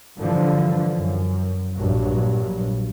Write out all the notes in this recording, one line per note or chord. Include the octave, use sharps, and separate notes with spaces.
G2 D3 E3 F3
F#2
A#1 G2 F#3